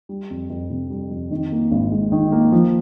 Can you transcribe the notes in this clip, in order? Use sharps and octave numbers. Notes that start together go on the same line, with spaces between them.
G3
F2
F2
C3
G3
F2
D#3
A#3
G#1
G#2
D#3
A#3
F3